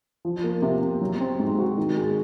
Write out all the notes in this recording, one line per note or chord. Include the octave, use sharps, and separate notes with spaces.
F3
A#3
C3
C3
F#3
C4
G#2
F#4
D#3
G#3